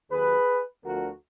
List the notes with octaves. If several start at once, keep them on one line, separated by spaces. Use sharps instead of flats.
D#2 D#3 F#3 G#4 B4
D2 D3 F3 B3 F#4 A#4